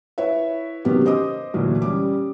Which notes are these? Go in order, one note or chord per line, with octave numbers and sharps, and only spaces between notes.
E4 B4 C#5 E5
C3 D#3 F#3 B3 C#4 G4
C5 D#5 D6 D#6
D2 A#2 E3 F#3 A3
G3 C#4 D6